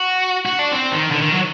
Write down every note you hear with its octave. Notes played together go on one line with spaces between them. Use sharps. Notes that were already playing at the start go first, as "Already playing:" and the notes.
Already playing: F#4
F#4
D4
C4
D#3
D3
D#3
F#3